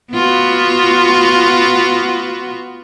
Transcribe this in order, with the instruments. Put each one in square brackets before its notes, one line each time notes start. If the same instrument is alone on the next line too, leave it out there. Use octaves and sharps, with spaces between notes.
[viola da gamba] B3 F4 F#4